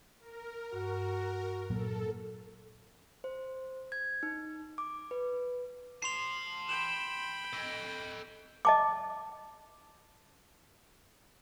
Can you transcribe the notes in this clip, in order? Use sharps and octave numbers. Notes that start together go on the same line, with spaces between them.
A#4
G2 F#4
A#2 F#3 A#3 A4
C5
G#6
D#4
D6
B4
A5 C6 C7 F7
G5 B5 E7 F#7
A4 D#5
D#5 A5 D6